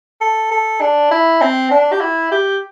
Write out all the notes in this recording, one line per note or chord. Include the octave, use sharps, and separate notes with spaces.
A4
A4
D4
E4
C4
D4
G4
E4
G4